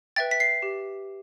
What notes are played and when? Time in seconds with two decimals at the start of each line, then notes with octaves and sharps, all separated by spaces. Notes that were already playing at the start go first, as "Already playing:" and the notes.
0.16 B4 E5 G5 A6
0.31 B6
0.40 C7
0.62 G4